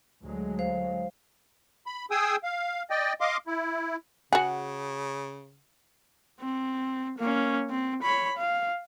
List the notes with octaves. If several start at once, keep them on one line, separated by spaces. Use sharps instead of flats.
D2 F#3 G#3
C5 F5
B5
G#4 G5 G#5 D#6 E6
F5
D5 D#5 G5
D#5 F5 C6 D6
E4
C#3 F#4 G#4 F#5
C4
A#3 C#4
C4
C#5 B5
F5